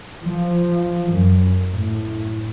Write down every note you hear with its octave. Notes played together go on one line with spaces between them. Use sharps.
F3
F#2
A2